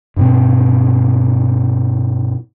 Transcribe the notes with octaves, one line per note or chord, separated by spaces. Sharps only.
G2 B2 C4